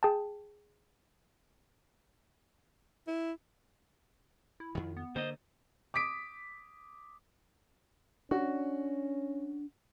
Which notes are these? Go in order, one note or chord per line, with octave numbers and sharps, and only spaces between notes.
G#4 G5 A5
E4
E4
F2 D#3
B3
D3 A#3 C5 D#5
D6 D#6 B6 D7
C#4 D4 F#4